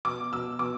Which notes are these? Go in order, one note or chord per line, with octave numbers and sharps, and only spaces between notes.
B2 D6
B2 E6
B2 D6